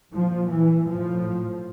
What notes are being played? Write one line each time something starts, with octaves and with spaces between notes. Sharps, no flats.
A#2 F3
E3
A2 F3